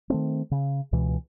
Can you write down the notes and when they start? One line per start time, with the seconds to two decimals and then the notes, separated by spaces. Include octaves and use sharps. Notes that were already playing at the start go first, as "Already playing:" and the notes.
0.10 D#3 A3 C4
0.51 C#3
0.93 C#2 B2 E3